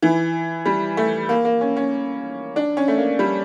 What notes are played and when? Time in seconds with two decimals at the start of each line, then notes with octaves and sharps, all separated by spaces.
0.02 E3
0.65 G3
0.97 A3
1.29 A#3
1.45 A#3
1.61 C#4
1.76 C#4
2.56 D4
2.77 C#4
2.88 A3
2.98 A#3
3.19 G3